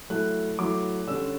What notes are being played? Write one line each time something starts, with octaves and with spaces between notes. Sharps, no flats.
F#3 A3 E4 F#6
F#3 A3 E4 D6
D3 G3 C#4 E6